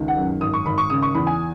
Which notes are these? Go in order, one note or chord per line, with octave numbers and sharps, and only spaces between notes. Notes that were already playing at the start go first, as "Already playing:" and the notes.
Already playing: C#2 D#3
F#5
F#2
G#1 D#6
C#6
G#1 B5
C#6
C#3 D#6
C#6
E2 B5
G#5